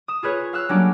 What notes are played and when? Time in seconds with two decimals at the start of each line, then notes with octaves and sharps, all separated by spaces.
0.08 D#6 E7
0.23 F4 G#4 B4 C#5
0.53 F5 E6 F#6
0.69 F#3 G3 A#3 C#4 D4